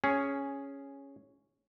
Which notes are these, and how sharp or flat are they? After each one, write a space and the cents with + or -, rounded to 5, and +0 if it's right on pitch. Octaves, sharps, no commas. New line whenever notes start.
C#4 +0 G#4 +0